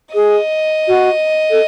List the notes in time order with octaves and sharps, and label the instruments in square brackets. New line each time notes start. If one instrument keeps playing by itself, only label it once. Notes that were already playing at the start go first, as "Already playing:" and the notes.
[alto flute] G#4 [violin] D#5
[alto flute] F#4
A4